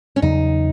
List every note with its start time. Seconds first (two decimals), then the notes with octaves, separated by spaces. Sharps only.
0.16 C#4
0.22 E2 C#3 F#3 D#4